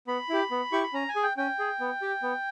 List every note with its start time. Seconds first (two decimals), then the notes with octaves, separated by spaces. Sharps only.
0.07 B3 B5
0.29 E4 G4
0.51 B3
0.72 E4 G4 C#6
0.83 B5
0.93 C#4 A#5
1.09 G#5
1.16 G#4
1.23 G5
1.37 C#4 G5
1.59 G#4
1.80 B3
2.02 G4
2.23 B3